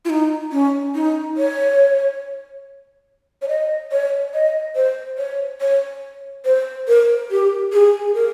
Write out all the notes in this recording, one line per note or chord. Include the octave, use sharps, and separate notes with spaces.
F4
D#4
C#4
D#4
C#5
C#5
D#5
C#5
D#5
C5
C#5
C#5
C5
A#4
G4
G#4
G#4
A#4